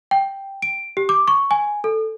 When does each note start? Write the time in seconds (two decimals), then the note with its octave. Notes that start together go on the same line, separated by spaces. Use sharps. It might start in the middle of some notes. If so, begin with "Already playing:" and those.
0.11 G5
0.62 D7
0.97 G4
1.09 D6
1.28 C#6
1.51 G#5
1.84 A4